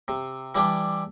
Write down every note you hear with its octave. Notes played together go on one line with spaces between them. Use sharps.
C3
E3 G3 D4 G4